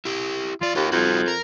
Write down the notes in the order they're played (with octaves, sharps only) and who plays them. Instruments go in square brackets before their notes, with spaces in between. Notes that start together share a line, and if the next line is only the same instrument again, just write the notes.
[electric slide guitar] E4 G4
[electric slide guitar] E2 D5 [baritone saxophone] F4
[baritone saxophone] D#2 [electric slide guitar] F4 G4
[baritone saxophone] F2 [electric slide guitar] G3 D#4 F#4
[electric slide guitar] A#4